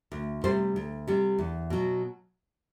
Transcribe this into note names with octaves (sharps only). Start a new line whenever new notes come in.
D2
C3 G3 C5
D2
C3 G3
E2
B2 F#3